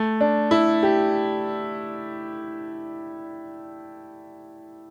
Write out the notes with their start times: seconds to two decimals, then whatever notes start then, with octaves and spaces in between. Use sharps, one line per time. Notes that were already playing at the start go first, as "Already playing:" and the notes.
Already playing: A3
0.21 D4
0.51 E4
0.83 G4